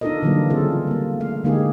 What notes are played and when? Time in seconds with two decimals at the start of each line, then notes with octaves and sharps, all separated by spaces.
0.01 D4 D#4 F4 A4 A#4 D#5
0.22 D3 E3 F#3 G3 A#3
0.50 C#3 C4 F4 G#4 A4
0.87 G3 A#3
1.20 A3 F5
1.44 D3 G#3 A#3 D#4 G4 G#4